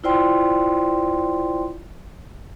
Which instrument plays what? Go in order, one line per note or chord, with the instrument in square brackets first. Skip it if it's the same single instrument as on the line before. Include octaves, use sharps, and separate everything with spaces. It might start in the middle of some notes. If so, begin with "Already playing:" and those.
[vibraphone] E4 F4 C5 D5 G5 C6